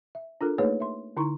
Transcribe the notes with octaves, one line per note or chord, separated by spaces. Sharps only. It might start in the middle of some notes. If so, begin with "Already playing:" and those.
E5
D4 F4 A4 A#4
A3 A#3 D#4 G#4 B4 C#5
E5 C6
D3 D#4 E4 A#5 C6 C#6